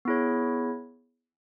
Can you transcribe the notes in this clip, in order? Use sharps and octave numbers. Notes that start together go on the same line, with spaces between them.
B3 E4 G#4 C#5